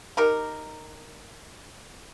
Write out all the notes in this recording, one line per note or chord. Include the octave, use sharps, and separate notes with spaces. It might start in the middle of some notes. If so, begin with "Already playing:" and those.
D#4 G4 A#4